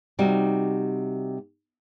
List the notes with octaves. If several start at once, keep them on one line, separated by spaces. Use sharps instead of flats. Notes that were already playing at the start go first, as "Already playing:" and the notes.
C3 G3 D#4 F#4